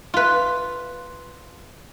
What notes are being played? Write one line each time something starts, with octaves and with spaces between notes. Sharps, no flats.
F4 B4